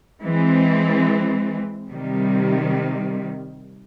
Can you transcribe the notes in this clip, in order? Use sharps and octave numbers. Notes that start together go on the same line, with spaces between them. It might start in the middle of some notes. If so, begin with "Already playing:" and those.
E3 G#3 C4
C3 D#3 G3